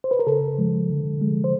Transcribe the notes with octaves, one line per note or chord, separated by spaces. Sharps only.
C5
B4
A#4
C#3 A4
F3 G#3
D3
F3 G#3
C5